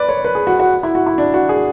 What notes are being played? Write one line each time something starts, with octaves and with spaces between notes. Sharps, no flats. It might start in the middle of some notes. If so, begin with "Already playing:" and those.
Already playing: B4 D5
C#5
B4
G#4
F#4
F#4
E4
F#4
E4
D4
F#4
G#4